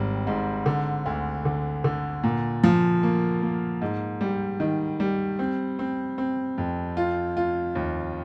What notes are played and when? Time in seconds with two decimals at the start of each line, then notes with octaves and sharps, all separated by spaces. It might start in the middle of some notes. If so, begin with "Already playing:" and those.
Already playing: G#1 G3
0.27 G#2
0.66 D3
1.06 D2
1.45 D3
1.84 D3
2.23 A#2
2.64 F3
3.03 A#3
3.42 A#3
3.82 G#2
4.21 G3
4.60 D#3
5.00 G3
5.39 C4
5.79 C4
6.18 C4
6.58 F2
6.97 F4
7.37 F4
7.75 D#2